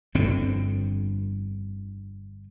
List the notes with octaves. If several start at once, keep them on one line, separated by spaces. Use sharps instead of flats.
G1 F2 D3 C4